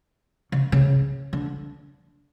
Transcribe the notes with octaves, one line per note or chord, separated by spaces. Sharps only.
C#3
C#3
D3